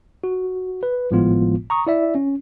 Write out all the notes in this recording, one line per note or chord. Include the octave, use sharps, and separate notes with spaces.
F#4
B4
G#1 A2 F3 G#3 B3 F4
A#5 C#6 D#6
E4 D5 E5
C#4